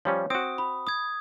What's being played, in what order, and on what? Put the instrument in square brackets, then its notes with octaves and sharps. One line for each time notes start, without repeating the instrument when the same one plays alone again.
[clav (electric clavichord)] F3 G3 C#4 [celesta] C#5
[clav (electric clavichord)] C4 F#4 [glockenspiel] D#6 [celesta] D7
[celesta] B5
[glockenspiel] D#6 G#6